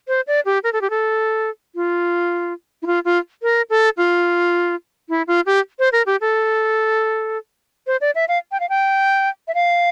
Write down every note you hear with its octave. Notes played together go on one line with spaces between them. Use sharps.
C5
D5
G4
A#4
A4
G4
A4
F4
E4
F4
F4
A#4
A4
F4
E4
F4
G4
C5
A#4
G4
A4
C5
D5
E5
F5
G5
F5
G5
E5
F5